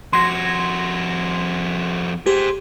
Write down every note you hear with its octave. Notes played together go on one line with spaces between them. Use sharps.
F2 F#4 C6 G#6 A#6
G4 G#4 C5